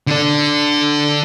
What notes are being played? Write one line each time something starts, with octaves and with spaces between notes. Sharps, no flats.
D3 D4